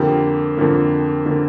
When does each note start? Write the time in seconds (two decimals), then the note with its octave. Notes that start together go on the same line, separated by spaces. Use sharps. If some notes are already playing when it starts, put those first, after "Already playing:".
Already playing: F2 D3 A#3 G4
0.57 F2 D3 A#3
1.26 D3 A#3